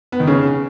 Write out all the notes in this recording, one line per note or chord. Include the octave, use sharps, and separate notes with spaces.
B3
D#3
C#3